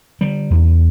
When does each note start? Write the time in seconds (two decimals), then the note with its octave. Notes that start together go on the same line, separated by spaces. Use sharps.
0.21 D3 G3
0.51 E2